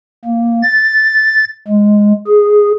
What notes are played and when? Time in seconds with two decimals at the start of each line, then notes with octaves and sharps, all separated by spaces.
0.25 A#3
0.63 A6
1.68 G#3
2.27 G#4